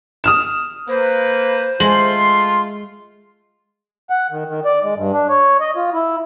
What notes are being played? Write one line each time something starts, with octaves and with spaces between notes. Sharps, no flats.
D#6 F6 E7
A#3 B4 C5
G#3 A3 F4 C6 F#7
F#5
D#3
D#3
D5
G#3
G2
D4
C#5
D#5
F4
E4